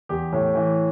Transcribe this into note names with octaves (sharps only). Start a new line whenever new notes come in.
E2 G4
A2
E3